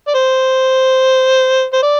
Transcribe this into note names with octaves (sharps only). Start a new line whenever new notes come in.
D5
C5
C5
D5